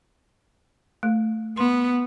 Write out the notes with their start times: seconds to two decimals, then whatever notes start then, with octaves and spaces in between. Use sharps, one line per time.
1.03 A3
1.57 B3 C6